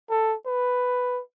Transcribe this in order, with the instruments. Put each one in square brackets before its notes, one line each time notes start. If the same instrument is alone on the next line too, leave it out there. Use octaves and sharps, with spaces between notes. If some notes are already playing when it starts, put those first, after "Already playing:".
[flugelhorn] A4
B4